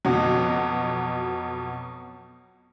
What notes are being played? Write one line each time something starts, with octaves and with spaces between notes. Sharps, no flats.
F2 B2 F#3